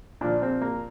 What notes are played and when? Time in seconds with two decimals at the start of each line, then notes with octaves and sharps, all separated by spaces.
0.21 A#2 F3 D4
0.42 C4
0.62 A#3